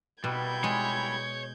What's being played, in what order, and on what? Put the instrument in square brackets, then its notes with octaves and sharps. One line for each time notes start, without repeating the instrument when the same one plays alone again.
[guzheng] B2 [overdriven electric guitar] G3 E4 [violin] G6 G#6
[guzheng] G#3 [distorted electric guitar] C#5